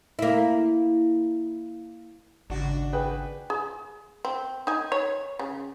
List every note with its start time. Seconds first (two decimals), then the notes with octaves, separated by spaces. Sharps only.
0.19 A#3 E4
2.50 G#1 C#3 D4 F#4
2.93 G#4 B4 G5
3.50 G#4
4.25 C4
4.67 D#4 G#5
4.92 C#5
5.39 C#3